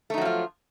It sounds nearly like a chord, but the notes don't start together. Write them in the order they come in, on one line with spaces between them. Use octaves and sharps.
A3 D#4 F#3 F3 F4